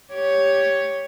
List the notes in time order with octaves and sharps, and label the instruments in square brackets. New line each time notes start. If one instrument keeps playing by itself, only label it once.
[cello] G4 C#5